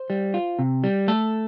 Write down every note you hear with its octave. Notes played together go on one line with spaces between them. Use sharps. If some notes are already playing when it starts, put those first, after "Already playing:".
Already playing: C5
G3
F4
C3
G3
A3 A4